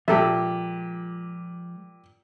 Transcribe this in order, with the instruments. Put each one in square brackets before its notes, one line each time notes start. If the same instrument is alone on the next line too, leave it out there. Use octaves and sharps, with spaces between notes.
[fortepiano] A#2 G4 [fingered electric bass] F3 G#3 [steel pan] A4 E5